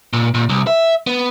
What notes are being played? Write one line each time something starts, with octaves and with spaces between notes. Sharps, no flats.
A#2
A#2
C2
E5
B3